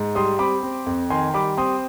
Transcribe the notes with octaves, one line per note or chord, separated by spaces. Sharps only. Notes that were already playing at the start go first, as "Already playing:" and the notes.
Already playing: G#2
G3 C6 D#6
C4 B5 D6
C4
F2
D#3 G#5 C6
G3 B5 D6
C4 C6 D#6